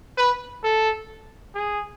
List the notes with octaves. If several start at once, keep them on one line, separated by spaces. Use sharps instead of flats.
B4
A4
G#4